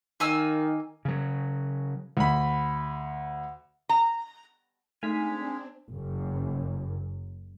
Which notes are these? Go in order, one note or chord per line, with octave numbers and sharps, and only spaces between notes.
D#3 A#3 G#5 E6
C#3 F#3
D2 B5
A#5
G#3 A3 C4 D4 D#4 F5 G#5 B6
F#1 F#2